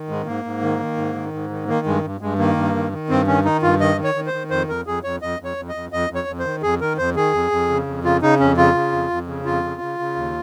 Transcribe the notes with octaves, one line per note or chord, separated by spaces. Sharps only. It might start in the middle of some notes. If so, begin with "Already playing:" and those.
Already playing: D#3
G#2 G#3
G#2 A#3
G#2
D#3
D#3
G#2
D#3
G#2
D#3
D#3 A#3
G2 G#3
G2
G2 G#3
D#3 A#3
G2
D#3
D#3
G2 C4
D#3 C#4
D#3 D#4
G2 F4
D#3 D#5
D#3
C#5
D#3
C5
D#3
F2 C5
F2 A#4
F2 G#4
F2 C#5
F2 D#5
F2 C#5
F2
D#5
F2
F2 D#5
F2
C#5
F2
C5
D#3
F2 G#4
D#3 A#4
F2 C5
D#3 G#4
F2
F2
C#3
F2
C#3 F4
C#3 D#4
F2 C#4
C#3 F4
C#3
F2
F2
C#3
F2 F4
C#3
C#3
C#3
D#2